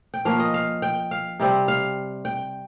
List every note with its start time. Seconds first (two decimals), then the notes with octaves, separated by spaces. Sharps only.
0.14 G5
0.25 F3 A#3 C#4 F5
0.39 D#5
0.54 F5
0.82 G5
1.11 F5
1.40 C3 G3 C4
1.68 F5
2.25 G5